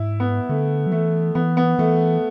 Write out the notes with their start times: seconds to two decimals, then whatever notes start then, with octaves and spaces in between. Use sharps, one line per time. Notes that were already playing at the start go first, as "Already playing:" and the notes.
Already playing: G#2 E4
0.20 B3
0.49 D3 A3
0.87 F#3
0.92 E3 A3
1.35 E3 B3
1.57 B3
1.79 E3 A3